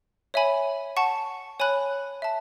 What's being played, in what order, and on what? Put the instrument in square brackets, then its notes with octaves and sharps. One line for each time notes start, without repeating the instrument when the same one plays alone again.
[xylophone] C#5 E5 G#5 B5
F#5 A5 C#6
C#5 G#5 B5 F#6
E5 A5